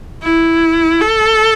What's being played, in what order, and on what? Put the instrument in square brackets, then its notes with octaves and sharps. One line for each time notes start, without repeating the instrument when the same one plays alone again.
[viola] E4
A4